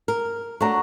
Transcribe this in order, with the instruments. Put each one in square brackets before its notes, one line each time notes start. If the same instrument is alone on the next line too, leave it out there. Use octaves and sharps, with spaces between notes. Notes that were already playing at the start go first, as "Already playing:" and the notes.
[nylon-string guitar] A#4
[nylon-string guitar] A3 D4 [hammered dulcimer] F#4 A#5